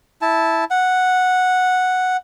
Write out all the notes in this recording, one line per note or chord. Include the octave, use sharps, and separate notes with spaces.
E4 A5
F#5